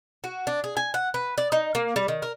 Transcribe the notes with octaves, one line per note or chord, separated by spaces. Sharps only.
F#4
D4
G#4
G#5
F#5
B4
D5
D#4
A#3
G3
D#3
A#4